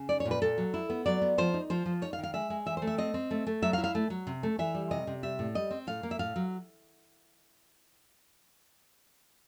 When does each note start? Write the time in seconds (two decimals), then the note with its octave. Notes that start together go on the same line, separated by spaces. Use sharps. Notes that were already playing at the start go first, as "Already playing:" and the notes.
Already playing: C#3
0.09 D#4 D5
0.20 C#5
0.25 A#2
0.31 B4
0.42 A#2 A4
0.58 F#3
0.74 E4
0.90 B3
1.06 F#3 D5
1.22 B3
1.38 F3 C5
1.54 D#4
1.70 F3 C5
1.86 F3
2.02 D#4 C#5
2.13 F5
2.18 D#3
2.23 F5
2.34 G#3 E5
2.50 G#3
2.66 E3 E5
2.77 C5
2.82 A3
2.87 E5
2.98 C4 D#5
3.14 C4
3.31 A3
3.47 A3
3.62 F#3 E5
3.73 F5
3.78 E4
3.84 F5
3.95 A3
4.10 F#3
4.27 C3
4.43 A3
4.59 E3 E5
4.74 G3
4.91 C3 D#5
5.07 C3
5.23 G3 E5
5.39 A2
5.55 G3 D#5
5.71 C4
5.87 A2 F5
6.03 A#3
6.11 E5
6.19 A2 F5
6.36 F#3